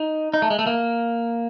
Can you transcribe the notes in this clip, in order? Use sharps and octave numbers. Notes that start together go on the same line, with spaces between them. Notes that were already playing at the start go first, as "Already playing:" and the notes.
Already playing: D#4
D#4
A3
G#3
A3
A#3